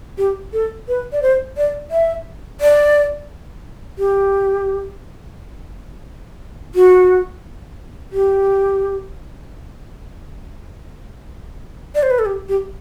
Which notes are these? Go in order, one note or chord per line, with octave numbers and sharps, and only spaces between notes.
G4
A4
B4
D5
C5
D5
E5
D5
G4
F#4
G4
D5
C5
B4
A4
G4
G4